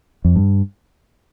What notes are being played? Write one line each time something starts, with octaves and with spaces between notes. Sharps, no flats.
F2
G2